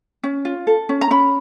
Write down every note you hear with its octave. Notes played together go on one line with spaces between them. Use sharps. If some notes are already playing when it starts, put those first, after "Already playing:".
C#4
F4
A4
C#4
A#5
C#4 B5